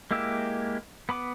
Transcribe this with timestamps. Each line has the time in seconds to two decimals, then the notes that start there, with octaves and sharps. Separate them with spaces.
0.11 G#3 A#3 E4 G4 E6
1.09 B3 B5 D6